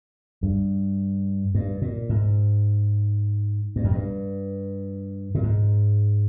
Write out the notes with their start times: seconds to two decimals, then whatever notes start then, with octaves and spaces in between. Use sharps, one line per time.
0.43 G2
1.55 G2
1.82 A#2
2.09 G#2
3.76 G2
3.84 F2
3.91 G2
5.35 A#2
5.43 G#2